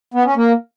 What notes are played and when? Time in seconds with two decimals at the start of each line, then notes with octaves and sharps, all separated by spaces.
0.14 B3
0.25 C#4
0.36 A#3